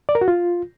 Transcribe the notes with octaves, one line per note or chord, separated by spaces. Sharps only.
D5
A#4
F#4
F4